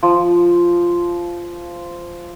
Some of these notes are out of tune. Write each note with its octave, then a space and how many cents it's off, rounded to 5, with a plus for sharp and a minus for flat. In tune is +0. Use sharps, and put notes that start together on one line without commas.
F3 -10